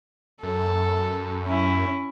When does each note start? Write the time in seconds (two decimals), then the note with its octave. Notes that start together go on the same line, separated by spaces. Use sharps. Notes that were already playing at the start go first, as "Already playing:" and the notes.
0.43 F#2 A4
1.45 C#4 E4